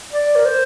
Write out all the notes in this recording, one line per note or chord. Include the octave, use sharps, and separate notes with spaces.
D5
A#4
C5